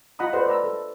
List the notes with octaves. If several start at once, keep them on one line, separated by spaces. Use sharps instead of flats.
F4 D#5 F#5 A#5 B5 D#6
G4 A4 B4 C5 D5 F#5
B4 D5 A#5 E6
A4